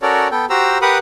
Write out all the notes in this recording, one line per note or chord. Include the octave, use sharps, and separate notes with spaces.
C#4 F#4 A4 A#4 C#5 D5
B3 A4 G5
F#4 G4 C5 A#5 E6
G4 A#4 B4 F#5 B5 D#6